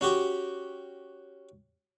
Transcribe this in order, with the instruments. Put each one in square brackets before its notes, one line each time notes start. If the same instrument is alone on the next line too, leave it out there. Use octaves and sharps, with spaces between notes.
[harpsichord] C#4 F#4 G4